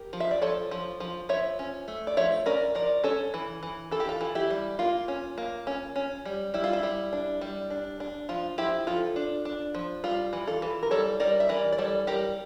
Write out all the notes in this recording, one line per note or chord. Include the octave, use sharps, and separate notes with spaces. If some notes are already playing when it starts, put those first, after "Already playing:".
Already playing: G4 A#4
F3
E5
D5
F3 A4 C#5
F3
F3
F3 C#5 E5
C#4
A3
D5
F3 C#5 E5
C#4 A#4 D5
F3 A#4 D5
C#4 A4 C#5
E3
E3
E3 A4
G4
F4 A4
E3
E4 G4
G3
A#3 F4
C#4
A#3
C#4
C#4
G3
G3 E4
F4
E4
G3
D4
G3
D4
D4
F3 F4
F3 E4 G4
F3 F4 A4
D4
D4
F3
G3 F4
E3
F4 A4
E3
A#4
G3 A4 C#5
G3 A#4 D5
E5
E3 A#4 D5
D5
G3 A4 C#5
G3 G4 A#4